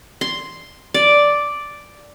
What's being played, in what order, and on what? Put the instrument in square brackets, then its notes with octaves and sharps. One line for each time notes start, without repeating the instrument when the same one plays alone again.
[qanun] C6
D5